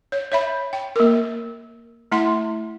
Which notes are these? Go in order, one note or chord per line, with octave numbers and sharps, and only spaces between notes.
C#5
C#5 E5 B5
G5
A#3 A#4
A3 E4 F#5 C6